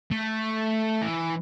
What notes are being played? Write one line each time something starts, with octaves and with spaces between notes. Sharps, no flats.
A3
E3